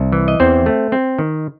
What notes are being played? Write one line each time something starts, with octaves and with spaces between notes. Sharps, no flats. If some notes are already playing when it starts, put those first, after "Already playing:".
Already playing: C2
E3
D#5
E2 C4 C5
A3
C4
D#3